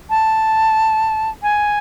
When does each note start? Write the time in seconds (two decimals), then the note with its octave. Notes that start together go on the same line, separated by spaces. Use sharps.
0.10 A5
1.42 G#5